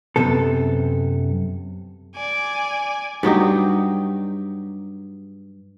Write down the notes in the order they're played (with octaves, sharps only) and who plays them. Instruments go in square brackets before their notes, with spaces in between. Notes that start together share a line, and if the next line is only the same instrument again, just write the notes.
[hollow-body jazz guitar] F#2 C3 B3 A4
[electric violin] D5 G#5
[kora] G2 F#3 D#4 G4